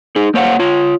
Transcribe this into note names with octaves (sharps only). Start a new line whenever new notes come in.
D#4 G#4
A#3 C5 C#5 F5 F#5
F4 C#5